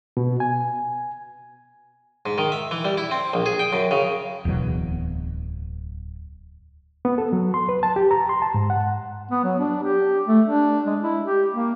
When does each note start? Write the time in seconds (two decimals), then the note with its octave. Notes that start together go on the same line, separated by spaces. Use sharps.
0.17 B2
0.40 G#5
2.26 G#2
2.38 D#3
2.52 E5
2.71 E3
2.85 G3
2.98 E4
3.11 C4
3.33 A#1
3.46 G#4
3.59 G5
3.73 F#2
3.91 C#3
4.45 D1 E2 B2 F#3
7.05 B3
7.18 A4
7.33 F#3
7.54 C6
7.69 B4
7.83 A5
7.96 G4
8.11 A#5
8.29 C6
8.42 A5
8.54 G#2
8.70 F#5
9.31 B3
9.44 F#3
9.59 D4
9.83 G4
10.27 A3
10.47 D4
10.87 G#3
11.01 E4
11.24 G4
11.53 A#3